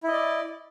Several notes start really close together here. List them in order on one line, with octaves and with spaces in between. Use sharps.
E4 D#5 D5